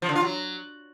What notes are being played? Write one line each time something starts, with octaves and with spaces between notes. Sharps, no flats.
F3
D3
F4
F#3